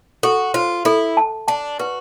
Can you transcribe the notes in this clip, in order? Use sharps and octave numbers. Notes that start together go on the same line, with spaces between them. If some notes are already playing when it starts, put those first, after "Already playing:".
F#4 A4
F4 C5
E4 A4
A5
D4 A5
F#4 B4